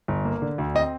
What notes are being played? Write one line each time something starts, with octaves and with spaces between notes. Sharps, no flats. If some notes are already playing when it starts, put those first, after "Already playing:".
G1
A#3
D3
D2
C4 D#5